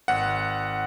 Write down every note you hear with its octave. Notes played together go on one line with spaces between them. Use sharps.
G#1 F#5